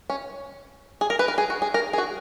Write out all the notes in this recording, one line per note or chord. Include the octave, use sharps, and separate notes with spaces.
C#4
G#4
A#4
B4
A#4
G#4
F#4
G#4
A#4
G#4
F#4